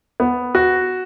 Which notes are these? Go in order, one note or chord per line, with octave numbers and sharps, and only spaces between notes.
B3
F#4